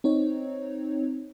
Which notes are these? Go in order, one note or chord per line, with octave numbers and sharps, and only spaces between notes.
C4 D#4 C#5